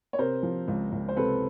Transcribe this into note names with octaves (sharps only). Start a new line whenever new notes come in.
C#5
C3 A#4 C5
F3
C#2
C#2
C5
C3 A4 B4